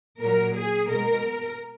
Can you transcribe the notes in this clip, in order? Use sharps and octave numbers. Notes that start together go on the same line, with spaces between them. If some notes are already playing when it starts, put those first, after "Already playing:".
A#2 F#3 A#4
G#4
B2 G#3 A#4